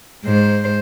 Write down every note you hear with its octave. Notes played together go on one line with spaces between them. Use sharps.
G#2 C5